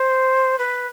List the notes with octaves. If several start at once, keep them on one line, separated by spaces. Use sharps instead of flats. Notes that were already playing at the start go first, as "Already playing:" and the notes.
Already playing: C5
B4